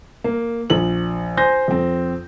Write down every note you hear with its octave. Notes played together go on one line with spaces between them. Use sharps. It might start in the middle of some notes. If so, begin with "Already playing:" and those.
A#3
A#1 F#7
C5 G#5 C6 G6 A#6
F2 C4